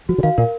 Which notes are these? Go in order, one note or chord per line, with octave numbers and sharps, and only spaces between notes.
F3 F#4
C#3
D#3 F5
A#2 A#4